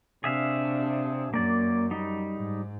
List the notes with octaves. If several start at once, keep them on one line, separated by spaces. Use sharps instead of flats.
C3 D4 G#4 E5 F5
F#2 A#3 D5
G3 D#4
G#2